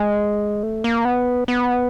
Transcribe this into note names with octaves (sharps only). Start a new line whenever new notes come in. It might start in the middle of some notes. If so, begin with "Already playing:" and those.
Already playing: G#3
A3
A#3
B3
B3